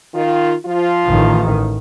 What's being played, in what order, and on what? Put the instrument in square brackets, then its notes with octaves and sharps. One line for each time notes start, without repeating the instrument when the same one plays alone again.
[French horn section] D#3 F4
F3 F4
[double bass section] A1 D#3